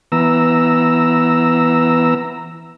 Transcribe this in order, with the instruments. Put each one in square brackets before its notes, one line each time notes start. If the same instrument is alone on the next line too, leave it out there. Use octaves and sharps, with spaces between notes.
[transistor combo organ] E3 B3 A#5 E6